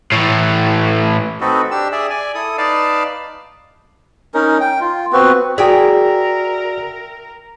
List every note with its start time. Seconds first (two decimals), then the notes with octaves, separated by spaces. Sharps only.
0.12 A2 E3
1.41 C4 D#4 F#4 A4 B4
1.71 D4 G4 E6
1.92 G#4 D5 E5
2.10 D5 G#5
2.35 E4 A4 D#6
2.58 D#4 B4 D5 F5 A5
4.34 C#4 D#4 A#4
4.61 G5
4.81 F4
5.13 B3 C4 F#4 B4
5.58 F#4 G#4 A#4 D5 E5 G5 A#5